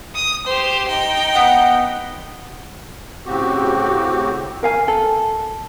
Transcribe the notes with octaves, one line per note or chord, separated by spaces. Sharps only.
D#6
G4 C5
D#4 G5
B3 F#5
A2 C#3 C4 F#4 G4
A#4 F5 G#5
A4